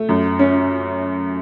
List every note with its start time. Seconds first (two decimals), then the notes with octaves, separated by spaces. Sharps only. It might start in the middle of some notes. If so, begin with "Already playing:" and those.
Already playing: A3
0.09 F#2
0.39 C#4